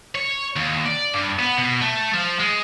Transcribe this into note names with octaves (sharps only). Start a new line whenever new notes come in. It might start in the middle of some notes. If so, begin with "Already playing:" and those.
C#5
D#2
D5
G2
B3
B2
A3
F3
G#3